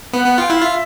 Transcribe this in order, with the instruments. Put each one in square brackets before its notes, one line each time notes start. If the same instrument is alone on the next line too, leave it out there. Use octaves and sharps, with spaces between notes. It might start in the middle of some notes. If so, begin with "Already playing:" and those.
[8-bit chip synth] B3 [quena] F#5
[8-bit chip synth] B3
[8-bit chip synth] F4 [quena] G5
[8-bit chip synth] E4 [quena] F#5
[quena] F5
[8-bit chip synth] F4 [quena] E5